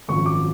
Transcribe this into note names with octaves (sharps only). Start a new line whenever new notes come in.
G#1 F#2 F3 C#6
D6